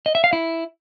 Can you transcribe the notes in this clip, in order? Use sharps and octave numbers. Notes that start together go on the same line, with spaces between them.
D#5
E5
F5
E4